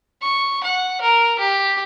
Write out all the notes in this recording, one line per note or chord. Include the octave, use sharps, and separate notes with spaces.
C#6
F#5
A#4
G4